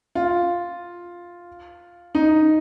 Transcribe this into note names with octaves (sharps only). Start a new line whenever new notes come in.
F4
D#4